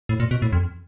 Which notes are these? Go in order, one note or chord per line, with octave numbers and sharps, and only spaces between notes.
A2
A#2
B2
A2
F2